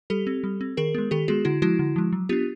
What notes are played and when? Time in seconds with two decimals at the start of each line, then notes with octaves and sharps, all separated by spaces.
0.10 G3 G4 A4
0.27 C4
0.44 G3
0.61 C4
0.77 D#3 G#4 A#4
0.95 G#3 B3
1.11 D#3 G4 A4
1.28 G#3 B3 F#4 G#4
1.45 D3 E4 F#4
1.62 F3 G#3 E4 F#4
1.79 D3
1.96 F3 G#3
2.13 F#3
2.29 B3 D4 F4 G4